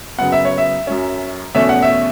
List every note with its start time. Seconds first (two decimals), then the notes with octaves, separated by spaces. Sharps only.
0.19 F#2 C#3 F#3 B3 F#5
0.32 E5
0.45 C#5
0.58 E5
0.87 F#2 F#3 C#4
1.55 E2 B2 A3 C#4 E5
1.69 F#5
1.82 E5